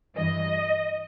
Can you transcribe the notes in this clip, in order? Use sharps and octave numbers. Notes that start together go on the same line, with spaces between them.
G2 E3 D#5